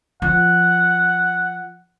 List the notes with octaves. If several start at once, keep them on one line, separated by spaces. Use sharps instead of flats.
F3 F#5